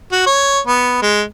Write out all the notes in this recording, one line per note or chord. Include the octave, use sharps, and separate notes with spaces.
F#4
C#5
B3
G#3